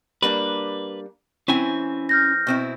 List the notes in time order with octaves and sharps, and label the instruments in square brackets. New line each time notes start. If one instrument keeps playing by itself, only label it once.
[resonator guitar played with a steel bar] G3 A#3 D4 [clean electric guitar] B4
[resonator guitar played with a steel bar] E3 C4 [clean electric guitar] C#4 E4 G#5
[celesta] F6 G6 A#6
[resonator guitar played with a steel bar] B2 C4 E4